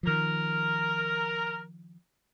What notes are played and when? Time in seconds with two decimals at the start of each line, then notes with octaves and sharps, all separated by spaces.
0.03 D#3 F3 A#4